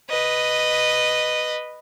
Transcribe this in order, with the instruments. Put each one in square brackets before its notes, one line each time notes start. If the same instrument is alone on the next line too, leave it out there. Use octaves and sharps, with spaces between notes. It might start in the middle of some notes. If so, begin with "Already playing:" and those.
[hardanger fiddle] B4 D#5